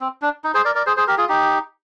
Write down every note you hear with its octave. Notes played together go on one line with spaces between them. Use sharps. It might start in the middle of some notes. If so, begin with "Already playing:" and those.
C4
D4
D#4
G#4 C5
A#4 D5
A#4 D5
G#4 C5
G#4 C5
G4 A#4
F4 G#4
D#4 G4